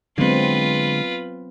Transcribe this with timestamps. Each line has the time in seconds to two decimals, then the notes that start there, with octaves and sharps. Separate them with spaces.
0.18 D3 F#3 G#3 B3 C4 F4 B4